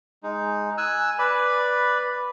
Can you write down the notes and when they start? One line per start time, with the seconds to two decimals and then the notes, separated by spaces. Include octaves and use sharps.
0.23 G#3 D#4
0.78 G#5 E6 F#6
1.19 B4 D5 B5